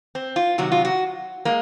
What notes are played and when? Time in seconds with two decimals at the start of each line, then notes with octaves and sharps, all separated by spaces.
0.15 C4
0.36 F4
0.58 C3 D#3 F#3 F#4
0.72 F4
0.85 F#4
1.45 G#3 A#3